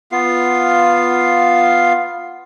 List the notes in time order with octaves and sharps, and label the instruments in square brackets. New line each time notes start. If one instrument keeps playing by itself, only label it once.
[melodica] B3 F4 F5